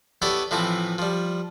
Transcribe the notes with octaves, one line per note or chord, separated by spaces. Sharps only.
B3 E4 G4 A4 C#5 D5
A2 E3 F3 C4 E4
F3 G3